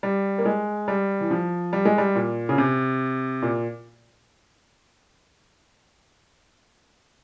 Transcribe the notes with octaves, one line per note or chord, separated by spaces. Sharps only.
G3
A#3
G#3
G3
E3
F3
G3
G#3
G3
A#2
C#3
C3
A#2